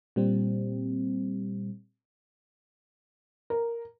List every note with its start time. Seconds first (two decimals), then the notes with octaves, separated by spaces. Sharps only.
0.16 A#2 G3 C4
3.50 A#4